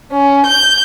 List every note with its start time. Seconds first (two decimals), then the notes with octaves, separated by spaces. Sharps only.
0.12 C#4
0.46 G6